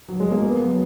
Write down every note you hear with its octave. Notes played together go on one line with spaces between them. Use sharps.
F#3
G#3
A#3
B3
F#3